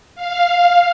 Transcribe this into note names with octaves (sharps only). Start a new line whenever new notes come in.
F5